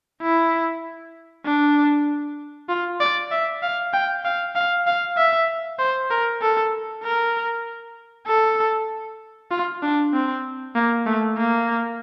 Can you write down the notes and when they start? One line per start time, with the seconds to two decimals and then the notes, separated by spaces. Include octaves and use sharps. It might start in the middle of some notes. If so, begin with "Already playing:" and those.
0.22 E4
1.45 D4
2.69 F4
3.00 D5
3.31 E5
3.62 F5
3.93 G5
4.25 F5
4.55 F5
4.87 F5
5.17 E5
5.79 C5
6.10 A#4
6.42 A4
7.03 A#4
8.27 A4
9.51 F4
9.82 D4
10.13 C4
10.75 A#3
11.06 A3
11.37 A#3